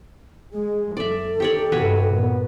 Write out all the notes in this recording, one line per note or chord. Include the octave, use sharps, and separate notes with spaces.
G#3 G#4
F#1 A4 D5 E5
D#3 G4 C#5 D5
G2 C3 D#3 F#4 B4 C#5
A#2 B3 A#4